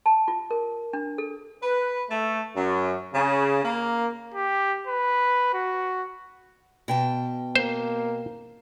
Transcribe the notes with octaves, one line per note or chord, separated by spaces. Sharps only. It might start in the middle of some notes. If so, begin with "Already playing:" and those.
A5
F4
A#4
D4
A4
B4
A3
F#2
C#3
A#3
G4
B4
F#4
B2 G5 A5
A#3 C5